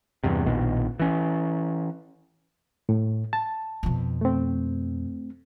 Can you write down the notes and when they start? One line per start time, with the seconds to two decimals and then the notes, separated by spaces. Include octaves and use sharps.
0.24 E2 G2 C3
0.46 A#1 B2 D#3
1.00 E3 C#4
2.89 A2
3.33 A5
3.83 F2 B2
4.21 A3 C4